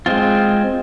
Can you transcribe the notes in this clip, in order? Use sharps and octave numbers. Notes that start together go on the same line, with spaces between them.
G#3 C4 F4